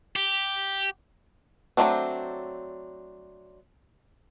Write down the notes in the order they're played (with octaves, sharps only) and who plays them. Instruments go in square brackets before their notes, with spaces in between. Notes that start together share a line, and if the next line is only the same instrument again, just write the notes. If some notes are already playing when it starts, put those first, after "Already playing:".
[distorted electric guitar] G4
[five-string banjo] F#3 G3 A3 C4 D4